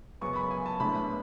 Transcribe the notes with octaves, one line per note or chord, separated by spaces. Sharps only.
F#2 C#3 G#3 B3 C#6
B5
G#5
A5
A1 A2 G#3 B3 D4 B5